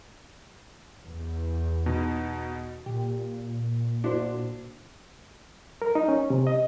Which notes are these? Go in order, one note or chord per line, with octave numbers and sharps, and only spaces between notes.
E2
B2 D#4
A#2 G4
D4 E4 F#4 C5
A#4
D#4
C#4
C3
D#5